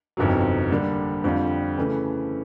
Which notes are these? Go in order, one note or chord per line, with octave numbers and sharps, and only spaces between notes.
G1 F2 C3 D#3 F#3
D3 G3 A#3 D4
F2 D3 G3 C4 F4
C#3 E3 A3